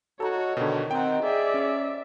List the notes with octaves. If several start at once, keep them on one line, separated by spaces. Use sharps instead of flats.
D#4 F#4 A4 C#5 A#5
B2 D3 D#3 G4
C4 D#4 D#5 F#5 G5
G#4 D5 E5
C#4 C5 F5